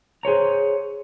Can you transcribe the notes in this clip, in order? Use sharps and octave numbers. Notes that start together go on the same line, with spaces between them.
G#4 C5 C#5 A#5